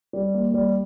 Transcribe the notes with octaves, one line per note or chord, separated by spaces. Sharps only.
G3
A#3
G3